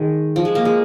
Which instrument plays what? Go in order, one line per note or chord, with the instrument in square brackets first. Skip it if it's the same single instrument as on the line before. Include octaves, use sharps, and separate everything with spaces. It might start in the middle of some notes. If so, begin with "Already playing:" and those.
Already playing: [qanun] D#3 G#3
F3
G#3
A#3
G#3